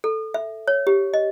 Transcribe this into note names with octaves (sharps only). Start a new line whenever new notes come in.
A4
E5
C#5
G4
D#5